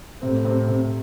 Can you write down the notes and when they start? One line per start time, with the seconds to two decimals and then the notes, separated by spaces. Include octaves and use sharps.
0.22 A2 C3 C4
0.45 C3 C4
0.68 C3 C4